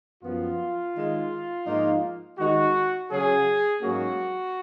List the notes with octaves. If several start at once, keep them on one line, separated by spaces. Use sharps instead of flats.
F#2 F3 B3 F4
D#3 G#3 D#4
G#2 F3 A#3 D#4
D#3 G#3 D#4 F#4
C#3 F#3 C#4 G#4
G#2 F#3 A#3 C#4 F#4